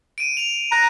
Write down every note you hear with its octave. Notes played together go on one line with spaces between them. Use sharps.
D7 D#7
F7
A#5 F#6